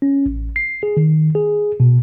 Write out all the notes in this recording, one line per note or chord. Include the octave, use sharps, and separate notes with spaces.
C#4
A1
C7
G#4
D#3
G#4
B2